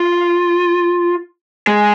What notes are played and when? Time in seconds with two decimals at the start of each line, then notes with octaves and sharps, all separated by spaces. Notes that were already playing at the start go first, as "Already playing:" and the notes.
Already playing: F4
1.67 G#3